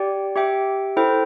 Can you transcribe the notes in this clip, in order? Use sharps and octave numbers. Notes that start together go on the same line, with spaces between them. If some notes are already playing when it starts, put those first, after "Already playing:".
Already playing: G4 D5 G5
G4 E5 G5
E4 A4 C5 G5